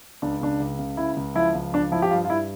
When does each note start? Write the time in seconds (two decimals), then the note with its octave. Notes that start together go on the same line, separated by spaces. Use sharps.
0.22 C#2 D4
0.41 C#3 D4
0.60 C#2
0.79 C#3
0.97 C#2 E4
1.17 C#2
1.35 F3 E4
1.54 C#2
1.73 F3 D4
1.92 F3 E4
2.02 G4
2.11 G2 F4
2.25 F4
2.30 G2 E4